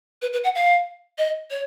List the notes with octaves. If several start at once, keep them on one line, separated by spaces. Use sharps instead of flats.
B4
B4
F#5
F5
D#5
C#5